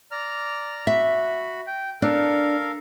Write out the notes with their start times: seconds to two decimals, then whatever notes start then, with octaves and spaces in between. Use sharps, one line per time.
0.11 D5 A#5 F6
0.87 F#4 E5 B5
1.67 G5
2.02 D4 A4 A#4 F5